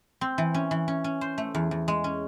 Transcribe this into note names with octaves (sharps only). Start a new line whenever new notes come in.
C4
E3
C#4
E3
C#4
C#4
C5
A3
E2
E2
G#3
C#4